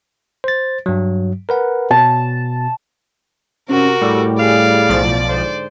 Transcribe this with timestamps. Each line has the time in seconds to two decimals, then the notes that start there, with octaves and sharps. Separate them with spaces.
0.44 C5 A6
0.86 G2 F#3
1.49 A#4 B4 F#5
1.91 B2 A5
3.69 C3 C#4 F#4 A#4
4.02 A2 G3 A4
4.40 G#4 D5 F5
4.89 B1 F3 A6
5.29 G#2 D3 C5